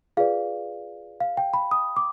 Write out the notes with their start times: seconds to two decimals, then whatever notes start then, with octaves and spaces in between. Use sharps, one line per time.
0.17 F4 G#4 B4 D5 F5
1.20 F5
1.37 G5
1.54 B5
1.71 D#6
1.96 D6